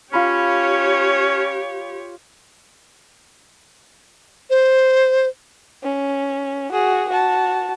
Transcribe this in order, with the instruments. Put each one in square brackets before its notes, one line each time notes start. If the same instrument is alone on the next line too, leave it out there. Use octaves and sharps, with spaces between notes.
[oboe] C#4 [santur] F4 B5 [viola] G4 C#5
[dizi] C5
[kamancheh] C#4
F#4 G#4
F#4 A5